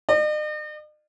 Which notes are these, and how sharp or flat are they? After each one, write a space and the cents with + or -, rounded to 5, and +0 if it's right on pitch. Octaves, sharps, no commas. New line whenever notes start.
D#5 -45